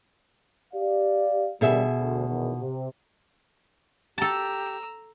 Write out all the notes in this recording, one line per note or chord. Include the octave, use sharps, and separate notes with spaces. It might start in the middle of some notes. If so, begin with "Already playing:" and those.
G4 D5 F5
B2 D3 D#3 G3 G#4 E5
D2
A#1 E2 D#3
C3
G4 A4 A5 A#5 E6